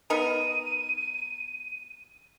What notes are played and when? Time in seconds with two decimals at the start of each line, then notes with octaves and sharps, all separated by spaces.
0.10 B3 D#4 A#4 D#7